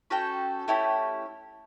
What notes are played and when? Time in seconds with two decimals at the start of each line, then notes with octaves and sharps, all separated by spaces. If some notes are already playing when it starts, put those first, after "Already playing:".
0.10 C#4 F#4 A4 G5
0.68 A3 C#4 E4 G4